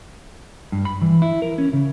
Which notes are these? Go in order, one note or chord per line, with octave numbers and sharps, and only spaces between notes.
G2
B5
E3
E4
A#4
C#4
C#3